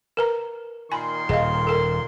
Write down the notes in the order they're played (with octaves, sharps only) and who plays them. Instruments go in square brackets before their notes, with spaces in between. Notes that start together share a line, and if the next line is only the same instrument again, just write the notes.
[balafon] A#4 B4 A#5
[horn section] A#2 D#3 C6 [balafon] G#5 B5
[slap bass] D#1 [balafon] G#4 D#5 F5
[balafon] A4 A#4